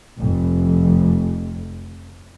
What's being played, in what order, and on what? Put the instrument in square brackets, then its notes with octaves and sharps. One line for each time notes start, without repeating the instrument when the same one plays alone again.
[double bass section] F1 F2